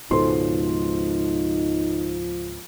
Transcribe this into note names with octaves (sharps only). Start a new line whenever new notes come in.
C#2 G#2 B2 F3 D#4 A4 C5 C6